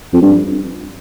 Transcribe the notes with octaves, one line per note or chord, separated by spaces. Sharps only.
F2
G2